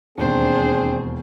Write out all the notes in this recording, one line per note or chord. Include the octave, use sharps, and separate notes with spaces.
E1 D#2 C4 D4 G#4 C5